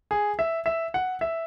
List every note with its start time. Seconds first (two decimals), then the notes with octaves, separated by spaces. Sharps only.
0.11 G#4
0.39 E5
0.66 E5
0.94 F#5
1.21 E5